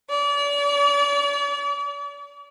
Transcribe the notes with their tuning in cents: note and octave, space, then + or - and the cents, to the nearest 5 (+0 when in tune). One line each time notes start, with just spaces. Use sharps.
D5 -40